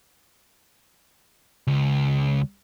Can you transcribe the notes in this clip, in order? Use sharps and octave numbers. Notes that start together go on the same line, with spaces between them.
C#2